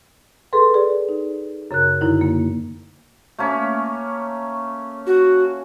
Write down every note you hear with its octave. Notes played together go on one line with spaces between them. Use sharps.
G#4 A4 B4 C6
G#4 D5
D#4
F#2 C#3 A#4 F#6
F#2 D3 D#4 E4
A#3
A3 A#3 C#4
F#4